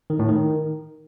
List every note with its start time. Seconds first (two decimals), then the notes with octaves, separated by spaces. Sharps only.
0.10 D#3
0.19 A2
0.29 D#3